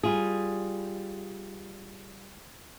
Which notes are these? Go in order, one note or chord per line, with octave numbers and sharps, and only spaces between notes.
G3 F4 G#4